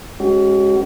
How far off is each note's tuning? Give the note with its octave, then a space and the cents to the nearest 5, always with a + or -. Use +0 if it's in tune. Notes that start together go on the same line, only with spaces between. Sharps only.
G#3 +0 C#4 -15 F#4 +35